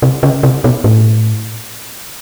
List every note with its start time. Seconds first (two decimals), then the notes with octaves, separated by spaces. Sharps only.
0.02 C3
0.23 C#3
0.43 C3
0.64 B2
0.84 A2